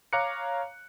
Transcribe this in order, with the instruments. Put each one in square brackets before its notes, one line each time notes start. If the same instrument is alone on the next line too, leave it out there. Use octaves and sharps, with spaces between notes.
[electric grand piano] C#5 F5 A#5 D6 F#6 C#7